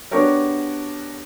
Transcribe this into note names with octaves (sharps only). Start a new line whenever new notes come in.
B3 D4 F#4 G4 A#4 C#5